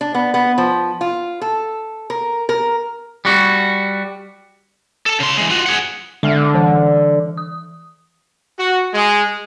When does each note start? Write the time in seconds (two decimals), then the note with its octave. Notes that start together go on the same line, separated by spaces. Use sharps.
0.01 D4
0.14 B3
0.34 B3
0.58 F3
1.01 F4
1.41 A4
2.10 A#4
2.49 A#4
3.25 G3 F#4
5.06 A4 A5
5.20 C#3 C6
5.37 E3 G#3
5.50 F4 F#4
5.66 G#4 F#5
6.23 D3 G#3 E5 F6
6.54 E3
7.37 D#6
8.60 F#4
8.94 G#3